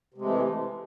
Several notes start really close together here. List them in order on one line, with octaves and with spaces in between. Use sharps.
C3 G#3 A3 E3